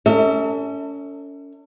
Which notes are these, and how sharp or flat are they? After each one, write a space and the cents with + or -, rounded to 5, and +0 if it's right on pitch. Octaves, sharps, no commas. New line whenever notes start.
C#4 +30 A4 +40 E5 -35